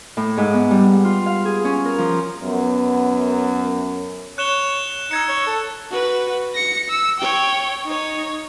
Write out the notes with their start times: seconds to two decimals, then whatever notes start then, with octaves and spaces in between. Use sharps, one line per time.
0.17 A2
0.38 G#2
0.53 B3
0.71 G3
1.04 F4
1.26 F5
1.45 G#4
1.65 C#4
1.85 A#4
1.98 F3
2.43 F#2 B3
4.38 C#5 F#6 E7 G7
5.11 D#4 E6 G#6 C#7
5.29 C#5
5.47 A4
5.91 F#4 B4
6.55 A#6 C#7
6.90 E6
7.20 C#5 G5
7.85 D#4 C#5